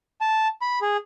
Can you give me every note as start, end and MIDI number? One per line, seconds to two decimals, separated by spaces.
0.21 0.48 81
0.62 0.79 83
0.82 0.97 68